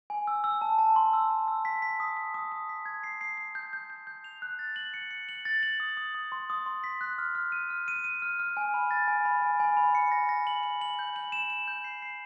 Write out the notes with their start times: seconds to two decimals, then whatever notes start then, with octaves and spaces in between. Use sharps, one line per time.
0.10 G#5
0.27 E6
0.44 E6
0.61 A5
0.79 A5
0.96 C6
1.13 E6
1.31 A5
1.48 E6
1.65 B6
1.82 B6
2.00 D#6
2.17 B6
2.34 D#6
2.52 D#6
2.69 B6
2.86 G#6
3.04 C7
3.21 C7
3.38 C7
3.55 G6
3.73 G6
3.90 G6
4.07 G6
4.24 F7
4.42 F#6
4.59 A6
4.76 F#7
4.94 C#7
5.11 C#7
5.29 F#7
5.45 A6
5.63 F#7
5.80 D#6
5.97 D#6
6.15 D#6
6.32 C6
6.50 D#6
6.66 C6
6.84 B6
7.01 F#6
7.18 F6
7.35 F6
7.52 D#7
7.70 F6
7.88 D#7
8.04 D#7
8.22 F6
8.40 F6
8.57 G#5
8.74 B5
8.91 A6
9.08 G#5
9.25 B5
9.42 G#5
9.60 G#5
9.77 B5
9.95 C#7
10.12 A#6
10.29 A#6
10.47 F#7
10.63 F#7
10.81 F#7
10.99 G6
11.16 F#7
11.32 E7
11.50 E7
11.68 G6
11.84 C7
12.02 C7